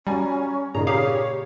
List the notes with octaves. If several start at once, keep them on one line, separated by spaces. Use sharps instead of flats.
G3 C#4 F#4 G#5 A#5
A#2 C#3 A#3 D#4 A#5
G4 G#4 C#5 F5